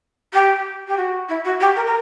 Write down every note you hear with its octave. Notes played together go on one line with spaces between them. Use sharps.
G4
G4
F#4
E4
F#4
G4
A#4
A#4